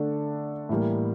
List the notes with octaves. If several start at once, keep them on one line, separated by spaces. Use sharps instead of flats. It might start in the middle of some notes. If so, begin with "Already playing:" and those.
Already playing: D3 A3 D4 A4
A2 E3 G3 A#3